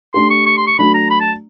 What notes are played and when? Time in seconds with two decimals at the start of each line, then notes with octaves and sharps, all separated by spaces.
0.14 A3 D4 G4 C6
0.30 C#6
0.46 C#6
0.57 C6
0.67 C#6
0.79 F#3 A3 D4 B5
0.94 A#5
1.10 B5
1.21 A5